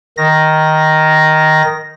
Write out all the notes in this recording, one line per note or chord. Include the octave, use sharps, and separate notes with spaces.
D#3 A#6